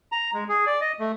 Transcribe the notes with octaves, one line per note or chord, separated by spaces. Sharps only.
A#5
G#3
G#4
D5
D#5
A3